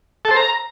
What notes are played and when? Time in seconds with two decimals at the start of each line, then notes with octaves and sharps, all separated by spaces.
0.25 A4
0.31 C5
0.36 A#5